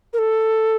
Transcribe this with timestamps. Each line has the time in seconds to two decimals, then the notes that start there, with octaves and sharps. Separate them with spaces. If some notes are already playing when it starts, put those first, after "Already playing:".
0.13 A#4
0.18 A4